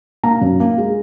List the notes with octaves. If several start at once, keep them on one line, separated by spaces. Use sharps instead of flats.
A#3 A#5
F#2
A#3
G#3